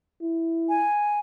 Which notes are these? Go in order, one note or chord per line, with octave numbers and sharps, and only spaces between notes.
E4
G#5